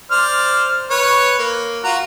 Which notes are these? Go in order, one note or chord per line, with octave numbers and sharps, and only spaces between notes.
C5 D5 F6
B4 C#5
A#3
F4 F#4 A#5